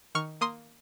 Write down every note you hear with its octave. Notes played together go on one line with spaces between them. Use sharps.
D#3 C#6 F6
A#3 C6 D#6